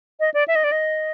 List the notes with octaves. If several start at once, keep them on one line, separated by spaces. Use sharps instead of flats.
D#5
D5
E5
D#5
D5
D#5